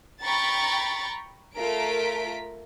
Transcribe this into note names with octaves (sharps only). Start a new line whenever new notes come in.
G5 A#5 B5 C#6 A6
A3 F4 A#4 B6 D7